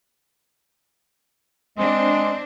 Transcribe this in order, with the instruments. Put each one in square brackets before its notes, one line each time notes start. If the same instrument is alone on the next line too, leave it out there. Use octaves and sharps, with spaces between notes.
[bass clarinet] G#3 [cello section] C4 D4